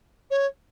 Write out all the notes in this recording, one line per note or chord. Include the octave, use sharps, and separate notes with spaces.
C#5